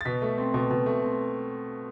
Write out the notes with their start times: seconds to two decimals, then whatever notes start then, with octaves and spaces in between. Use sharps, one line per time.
0.01 A6
0.05 B2 B6
0.22 A3
0.38 C4
0.54 B2
0.71 B2
0.86 A3
1.02 C4